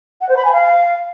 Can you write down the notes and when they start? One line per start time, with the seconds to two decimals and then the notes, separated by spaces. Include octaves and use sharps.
0.21 F#5
0.29 C5
0.37 B5
0.44 G#5
0.52 F5